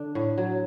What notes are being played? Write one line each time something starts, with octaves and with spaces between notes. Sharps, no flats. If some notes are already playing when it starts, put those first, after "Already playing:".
Already playing: D3 D4
A2
F#3